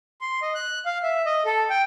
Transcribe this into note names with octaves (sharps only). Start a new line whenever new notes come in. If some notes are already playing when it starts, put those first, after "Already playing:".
C6
D#5
F#6
F5
E5
D#5
A4
G5